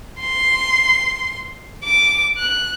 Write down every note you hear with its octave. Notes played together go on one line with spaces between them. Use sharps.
C6
D6
F#6